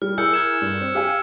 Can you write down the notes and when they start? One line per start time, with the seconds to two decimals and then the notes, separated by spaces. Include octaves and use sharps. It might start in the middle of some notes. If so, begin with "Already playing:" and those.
0.02 G3 F6
0.18 E4 G#4 A#4 E6 G6 C#7
0.34 F6 G#6 E7
0.62 G2
0.81 C4
0.95 G4 F5 G#5